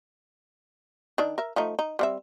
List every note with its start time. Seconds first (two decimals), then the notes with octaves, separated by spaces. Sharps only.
1.18 D#3 D4
1.38 A#4 E5
1.56 F3 A3 D#4
1.79 D#4
1.99 G3 C4 E5